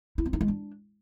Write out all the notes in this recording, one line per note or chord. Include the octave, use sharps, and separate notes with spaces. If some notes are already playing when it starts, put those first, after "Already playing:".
E4
C4
D#4
G#3
D4